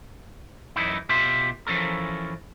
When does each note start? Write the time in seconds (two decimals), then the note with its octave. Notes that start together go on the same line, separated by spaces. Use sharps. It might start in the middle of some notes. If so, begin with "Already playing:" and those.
0.76 F#2 E3 D#4 E4
1.09 B2 F4 G4 E5 C6
1.67 E3 F3 C#4 A4 A#4